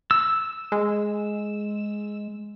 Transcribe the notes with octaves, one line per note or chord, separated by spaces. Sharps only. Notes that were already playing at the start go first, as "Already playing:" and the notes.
E6
G#3